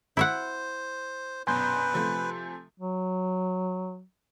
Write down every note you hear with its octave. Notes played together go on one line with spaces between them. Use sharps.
E4 C5 E5 F#5
A#1 F#2 B2 B4 G#5 C6 G6
C3 F3 A3
F#3